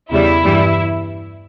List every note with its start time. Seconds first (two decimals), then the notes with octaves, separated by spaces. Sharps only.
0.11 E2 C#3 G3 E4
0.44 G2 E3 G3